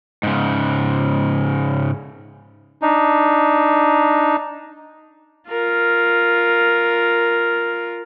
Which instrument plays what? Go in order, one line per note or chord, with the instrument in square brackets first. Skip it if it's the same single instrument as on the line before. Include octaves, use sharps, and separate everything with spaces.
[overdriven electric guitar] G#2 C#3
[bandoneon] D4 D#4
[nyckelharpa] F4 A#4